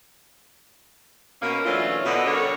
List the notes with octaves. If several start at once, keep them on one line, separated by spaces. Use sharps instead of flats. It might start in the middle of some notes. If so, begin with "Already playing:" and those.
B2 A#3 C#4
E3 F#3 A3 C#4 D4 F4
B2 D3 D#5
D3 G3 A#4 C#5